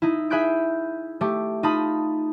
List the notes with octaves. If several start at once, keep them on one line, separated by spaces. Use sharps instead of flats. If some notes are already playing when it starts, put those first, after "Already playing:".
D#4 E4
G#4 E5 B5 F#6 G6 D7
A3 G4
D#4 F4 A5 B5 D#6